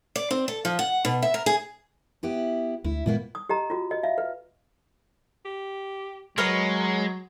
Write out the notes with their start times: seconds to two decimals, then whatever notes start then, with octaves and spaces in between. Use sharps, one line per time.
0.16 D5
0.31 C4
0.48 A4
0.65 F3
0.79 F#5
1.05 B2
1.22 E5
1.34 A#4
1.46 G#4
2.23 B3 E4 G4
2.84 D2 E4
3.06 A#2 D#3 G#3 A#3 B3 E4
3.35 D#6
3.49 G4 D#5 A#5
3.70 F4 F#4
3.91 D#5
4.03 E5 F5
4.18 B4
5.45 G4
6.38 F#3 G#3 A#4 B4 C#5 D#5